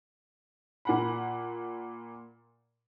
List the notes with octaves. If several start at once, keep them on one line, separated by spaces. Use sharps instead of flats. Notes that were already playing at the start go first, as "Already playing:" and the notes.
A#2 F#5 B5